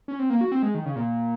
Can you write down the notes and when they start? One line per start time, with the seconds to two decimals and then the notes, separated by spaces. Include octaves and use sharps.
0.08 C#4
0.19 C4
0.30 A#3
0.41 F#4
0.52 C4
0.63 G#3
0.75 D#3
0.86 C#3
0.96 A#2